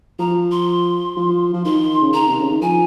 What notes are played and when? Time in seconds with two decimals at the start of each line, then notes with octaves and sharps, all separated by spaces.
0.19 F3 A#5
0.51 C6
1.17 F3
1.53 F3
1.65 D#3 C6
2.02 C#3
2.14 D#3 A#5
2.29 C3
2.40 C#3
2.51 D#3
2.62 F3 G#5